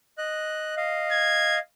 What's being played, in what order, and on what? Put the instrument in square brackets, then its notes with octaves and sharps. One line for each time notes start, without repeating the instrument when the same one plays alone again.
[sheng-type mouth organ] D#5 F#6
D#5 F5
[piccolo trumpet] G#6